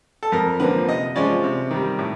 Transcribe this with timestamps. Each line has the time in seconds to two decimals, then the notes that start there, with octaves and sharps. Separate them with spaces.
0.23 A4
0.32 F2 A#4
0.60 D3 F3 A#3 B4
0.88 C3 D#5
1.16 F3 G#3 C#4 F4 D5
1.44 C3
1.71 D#3 G3
1.99 A2